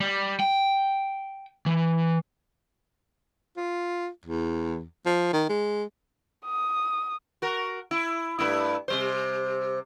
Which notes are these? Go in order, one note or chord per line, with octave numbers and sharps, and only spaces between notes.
G3
G5
E3
F4
E2
F3
D#3
G#3
D#6
F#4 A#4
E4
G2 A3 E4
C3 G3 C5